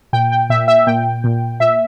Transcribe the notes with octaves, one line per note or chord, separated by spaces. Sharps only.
A#2 G5
G5
A#2 E5
E5
A#2 G5
A#2
A#2 E5